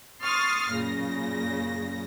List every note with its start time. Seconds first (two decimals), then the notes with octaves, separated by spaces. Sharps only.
0.22 C6 C#6 D#6 F6 A6 C7
0.74 F#2 A#2 C#3 A#6